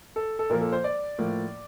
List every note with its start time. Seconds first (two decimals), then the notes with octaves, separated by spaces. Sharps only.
0.16 A4
0.39 A4
0.50 A#2 F3 A#3 A#4
0.61 A4
0.72 C5
0.84 D5
1.18 A2 F3 A#3